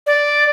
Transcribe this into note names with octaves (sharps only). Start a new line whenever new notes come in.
D5